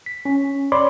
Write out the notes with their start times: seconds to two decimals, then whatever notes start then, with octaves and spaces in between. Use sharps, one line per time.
0.06 B6
0.25 C#4
0.72 C#5 D5 B5 C6 D6